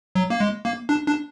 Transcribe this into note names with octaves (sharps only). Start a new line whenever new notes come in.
F#3
A#3
G#3
A#3
D4
D4